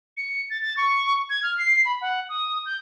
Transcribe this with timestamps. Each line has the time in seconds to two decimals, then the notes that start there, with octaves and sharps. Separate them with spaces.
0.17 C#7
0.50 A6
0.62 A6
0.77 C#6
1.30 G#6
1.43 F6
1.58 C7
1.85 B5
2.01 F#5
2.29 D#6
2.66 G6